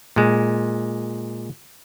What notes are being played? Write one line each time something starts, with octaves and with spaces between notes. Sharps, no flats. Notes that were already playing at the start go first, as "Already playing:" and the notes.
A#2 G#3